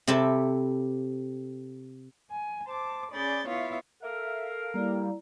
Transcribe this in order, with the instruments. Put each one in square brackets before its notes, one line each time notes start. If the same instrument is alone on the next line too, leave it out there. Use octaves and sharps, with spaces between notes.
[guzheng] C3 E4 G4 A4
[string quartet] G#5
C5 A5 D6
C#4 G#4 D5 B5 G6 A6
B3 E4 F4 C#5 E5 F5
[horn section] A4 A#4 F5 [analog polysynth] E5
[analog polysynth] G3 A#3 [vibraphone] E4 D5 A#5